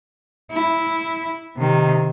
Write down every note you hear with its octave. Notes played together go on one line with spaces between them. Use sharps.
E4
C3 D#3